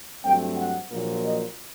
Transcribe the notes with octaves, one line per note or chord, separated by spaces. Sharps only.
G2 F#3 A3 C4 G5
F#5
A#1 A#2 F#3 A#3
D#5